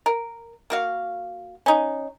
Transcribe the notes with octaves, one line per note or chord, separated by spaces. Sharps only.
A#4
A#3 F#4 F5
C#4 D#4